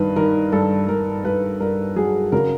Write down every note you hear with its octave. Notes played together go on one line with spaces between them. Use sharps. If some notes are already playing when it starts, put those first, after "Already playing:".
Already playing: G2 D#3 B4
D#3 A#4
G2 A4
G2 A#4
G2 B4
G2 A#4
F#3 G#4
C#3 A#4